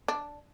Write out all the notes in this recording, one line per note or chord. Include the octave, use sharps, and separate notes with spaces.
D4